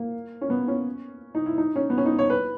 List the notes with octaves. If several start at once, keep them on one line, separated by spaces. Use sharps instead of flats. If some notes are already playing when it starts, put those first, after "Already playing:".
Already playing: A#3
C#4
B3
C#4
D#4
E4
D#4
C#4
B3
C#4
D#4
C#5
B4